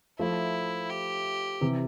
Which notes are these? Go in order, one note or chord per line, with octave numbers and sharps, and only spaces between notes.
F3 A3 E4
G4
C3 E3